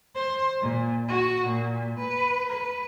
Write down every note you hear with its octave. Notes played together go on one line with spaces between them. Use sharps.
C5
A#2
F#4
A#2
B4
B4